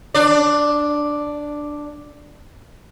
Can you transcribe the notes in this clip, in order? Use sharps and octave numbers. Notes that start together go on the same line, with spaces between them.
D4 D5